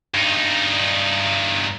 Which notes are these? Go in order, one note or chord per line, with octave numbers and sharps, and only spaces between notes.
G2 D#4